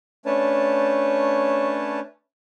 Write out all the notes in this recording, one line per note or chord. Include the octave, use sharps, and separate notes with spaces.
A3 C#4 D4 B4 C#5 A5